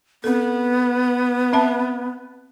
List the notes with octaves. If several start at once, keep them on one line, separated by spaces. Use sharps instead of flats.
B3 C4 A4
C4 E5 A5